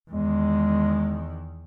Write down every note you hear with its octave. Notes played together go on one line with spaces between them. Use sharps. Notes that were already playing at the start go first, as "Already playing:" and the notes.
E2 D#3 G#3